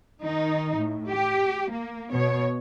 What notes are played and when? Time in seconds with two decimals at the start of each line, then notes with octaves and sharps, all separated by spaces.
0.22 D#3 D#4
0.77 A2
1.10 G4
1.72 A#3
2.10 B2 C#5